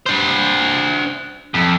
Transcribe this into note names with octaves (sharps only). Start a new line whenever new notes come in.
D4 C5
F2